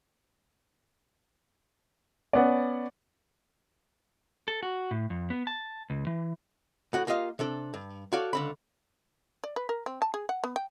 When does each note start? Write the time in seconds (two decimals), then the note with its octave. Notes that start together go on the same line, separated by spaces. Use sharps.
2.33 B3 C#4 D5 F#5
4.48 A4
4.63 F#4
4.91 A2
5.10 F2
5.30 B3
5.47 A5
5.90 C#2
6.07 E3
6.93 A2 F#4 F#5
7.07 A#3 F4 G4 D#5 F5
7.39 C3 D4 A4
7.74 G2
8.13 F#4 A4 C#5 D5 F5
8.33 C#2 D3 B5
9.44 D5
9.56 B4
9.69 A#4
9.86 C4
10.02 A5
10.14 G#4
10.29 F#5
10.44 B3
10.56 G5